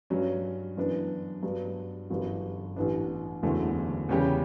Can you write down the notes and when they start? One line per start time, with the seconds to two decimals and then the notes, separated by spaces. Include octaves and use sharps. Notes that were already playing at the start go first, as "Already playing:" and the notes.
0.10 G2 F#3 C#4
0.77 F#2 E3 B3 D4
1.43 G2 F#3 B3 D4
2.10 G1 F#2 E3 G3 B3
2.76 A1 A2 E3 B3 D4
3.43 F#1 E2 D3 F#3 A3
4.09 E2 C#3 G3 C#4 G4